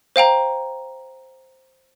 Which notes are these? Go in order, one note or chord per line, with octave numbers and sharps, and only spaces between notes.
C5 F5 G5 A#5